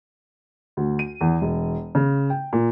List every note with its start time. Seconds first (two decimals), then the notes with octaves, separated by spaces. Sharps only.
0.77 D2
0.99 D#7
1.21 E2
1.42 E1
1.95 C#3
2.30 G5
2.53 A#2